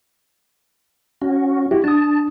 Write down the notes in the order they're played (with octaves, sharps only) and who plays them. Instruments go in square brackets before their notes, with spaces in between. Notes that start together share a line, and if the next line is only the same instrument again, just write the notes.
[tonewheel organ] C#4 F#4
[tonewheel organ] E4 [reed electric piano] F#4 G4
[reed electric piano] D4 D#6 [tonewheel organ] A5